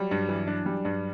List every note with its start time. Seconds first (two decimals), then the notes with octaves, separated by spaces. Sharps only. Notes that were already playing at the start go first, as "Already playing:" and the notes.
Already playing: F#3 G3
0.11 G2
0.29 E3
0.47 D4
0.66 G3
0.85 G2